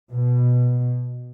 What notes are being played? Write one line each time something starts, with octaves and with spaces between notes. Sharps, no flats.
B2